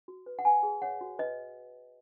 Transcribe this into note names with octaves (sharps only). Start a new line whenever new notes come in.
F#4
B4
F#5
B4 G#5
G#4
C#5 F#5
F#4
B4 D#5